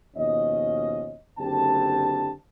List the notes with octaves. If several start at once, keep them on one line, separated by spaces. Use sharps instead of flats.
D#2 B2 F3 C#4 D#5
F#1 D3 C4 D4 G4 A5